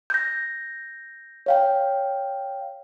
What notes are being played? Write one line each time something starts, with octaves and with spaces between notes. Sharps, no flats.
G6 A#6
C#5 F5 G5